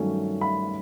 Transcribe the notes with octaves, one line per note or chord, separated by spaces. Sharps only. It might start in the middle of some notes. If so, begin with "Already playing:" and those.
Already playing: G2 D#3 F#3 A3 C#4
B5